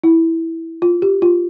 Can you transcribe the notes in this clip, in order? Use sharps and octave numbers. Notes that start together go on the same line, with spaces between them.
E4
F4
G4
F4